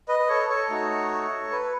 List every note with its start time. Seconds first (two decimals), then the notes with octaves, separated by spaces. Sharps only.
0.08 B4 D#5
0.19 B4
0.29 A4 C#5
0.49 A4 C#5
0.69 A3 D#4 F#4
1.52 B4